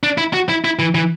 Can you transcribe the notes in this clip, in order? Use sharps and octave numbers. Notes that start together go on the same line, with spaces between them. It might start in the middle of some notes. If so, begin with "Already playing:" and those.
D4
E4
F#4
E4
E4
E3
E3